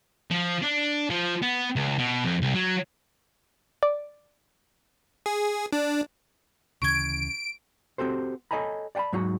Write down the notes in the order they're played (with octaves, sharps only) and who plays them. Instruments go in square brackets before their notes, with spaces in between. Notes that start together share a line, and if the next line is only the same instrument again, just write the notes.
[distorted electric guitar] F3
D4
F3
B3
C#2
B2
F2
C2
F#3
[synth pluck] D5
[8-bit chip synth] G#4
D4
[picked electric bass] D2 C#3 E3 [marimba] C#6 G#6 [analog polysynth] D7
[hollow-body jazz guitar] C4 F#4 G4 A4 C5
A4 C#5 D#5 G#5 A#5 B5
D5 F#5 G5 A5 B5
G#2 F#3 D#4 F#4 F#5